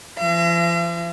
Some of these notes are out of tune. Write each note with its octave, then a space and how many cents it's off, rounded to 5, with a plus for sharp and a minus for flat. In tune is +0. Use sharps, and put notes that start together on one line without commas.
F3 -40 E5 +45